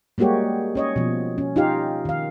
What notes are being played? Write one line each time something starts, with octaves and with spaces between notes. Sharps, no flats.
G3 G#3 A#3 F#4 G4 C#5
C#4 C#5 D#5
B2 F3
C#4
D#4 F4 G4 F5
D#3 F5